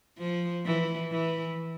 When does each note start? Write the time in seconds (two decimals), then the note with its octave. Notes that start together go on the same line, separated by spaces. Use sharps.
0.18 F3
0.66 E3
1.11 E3